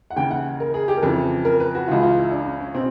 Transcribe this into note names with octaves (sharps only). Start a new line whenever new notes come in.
F#5
D#2 C#3 E3 G5
F#5
A#4
G#4
G4
A#4
F2 C#3 E3 A4
A#4
B4
F#4
C#2 C#3 E3 F4
F4
E4
D4
C#4
C#4
B2 C4